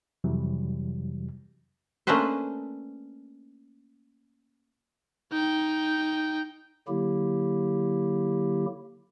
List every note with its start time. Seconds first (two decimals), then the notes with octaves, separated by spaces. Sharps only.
0.24 F2 C3 E3 F#3 G3
2.07 A3 A#3 C#4 D4 B4 C5
5.32 D#4 G5
6.88 D3 F#3 A#3 E4 G4